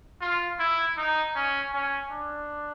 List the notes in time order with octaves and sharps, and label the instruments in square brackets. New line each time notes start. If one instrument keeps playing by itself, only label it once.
[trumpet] F4
E4
D#4
C#4
C#4
D4